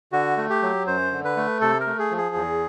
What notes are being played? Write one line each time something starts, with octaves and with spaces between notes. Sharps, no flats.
D3 F#4
A3
G4
F#3
F#2 C5
D3
B4
A3
C3 A4
A#4
A3
G#4
F3
G#4
E2